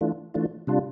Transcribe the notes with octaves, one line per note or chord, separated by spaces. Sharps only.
E3 A3 D4 F4
E3 A3 D4 F4
C3 G3 D4 F4